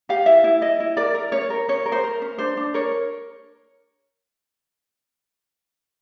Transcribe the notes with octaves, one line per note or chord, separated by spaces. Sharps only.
G4 F5
E4 E5
E4
E4 D#5
E4
A#4 D5
A#4
C#4 C#5
A#4
C#4 C#5
A#4
C5
A#4
C#4
D4 C5
D4
A#4 C#5